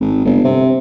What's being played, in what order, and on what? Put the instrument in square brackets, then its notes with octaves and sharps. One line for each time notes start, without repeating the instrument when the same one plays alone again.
[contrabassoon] G#1
G1
C3